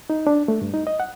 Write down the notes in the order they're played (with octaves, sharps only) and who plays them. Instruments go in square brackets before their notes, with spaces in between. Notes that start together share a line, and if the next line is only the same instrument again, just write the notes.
[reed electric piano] D#4
D4
A3
G2
D#4
D#5
F#5